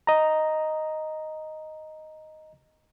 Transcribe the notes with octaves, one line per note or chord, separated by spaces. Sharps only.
D#5 A#5